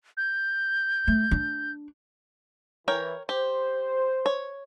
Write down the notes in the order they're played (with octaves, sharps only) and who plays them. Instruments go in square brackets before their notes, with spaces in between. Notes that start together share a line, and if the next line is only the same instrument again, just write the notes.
[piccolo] G6
[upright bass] A3
D4
[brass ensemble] E3 [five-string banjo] A#4 C#5 G5
[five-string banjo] G4 [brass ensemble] C5
[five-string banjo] C#5